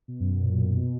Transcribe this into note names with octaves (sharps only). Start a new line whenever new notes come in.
B2
F#2
F#2
A#2
B2